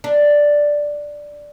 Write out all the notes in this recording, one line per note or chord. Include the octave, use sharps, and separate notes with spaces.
D4